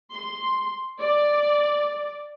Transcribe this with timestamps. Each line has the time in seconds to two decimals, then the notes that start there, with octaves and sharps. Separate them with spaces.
0.13 C6
1.00 D5